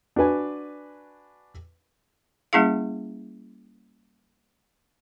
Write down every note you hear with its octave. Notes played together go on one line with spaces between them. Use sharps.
D4 F#4 B4 G#5
G3 A#3 C#4 E4 G#4 F5